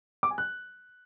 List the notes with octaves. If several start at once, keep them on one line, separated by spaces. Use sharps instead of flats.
D6
G#5
F#6